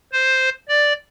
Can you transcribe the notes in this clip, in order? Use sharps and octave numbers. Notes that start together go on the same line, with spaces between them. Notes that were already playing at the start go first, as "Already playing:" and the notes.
C5
D5